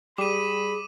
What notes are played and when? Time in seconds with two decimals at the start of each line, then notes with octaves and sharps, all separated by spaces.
0.18 G3 G#4 B5 D6 D#7